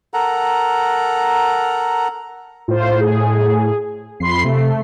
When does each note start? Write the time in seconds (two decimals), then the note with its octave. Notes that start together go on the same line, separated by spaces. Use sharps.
0.14 A4 A#4 F#5 A#5
2.68 A2 F4 C5
3.00 G#4
4.20 F2 B5 C6 C7
4.45 C3 A3